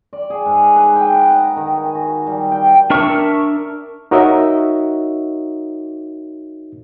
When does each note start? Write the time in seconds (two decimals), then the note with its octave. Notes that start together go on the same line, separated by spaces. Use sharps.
0.13 D5
0.30 G#4
0.46 G#2
0.76 B4
0.96 G5
1.14 F#5
1.31 D#4
1.56 D#3
1.77 G#5
1.95 F#4
2.27 G3
2.52 G5
2.90 D4 A#4 E5 C#6
4.11 D#4 F#4 A#4 C#5 D#5 E5